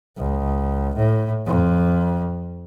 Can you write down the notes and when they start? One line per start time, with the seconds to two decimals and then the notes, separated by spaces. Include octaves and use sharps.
0.17 C#2
0.96 A2
1.46 F2